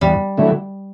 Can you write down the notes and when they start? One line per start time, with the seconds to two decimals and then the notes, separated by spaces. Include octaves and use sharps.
0.01 E2 G3
0.37 D3 F#3 A3 E4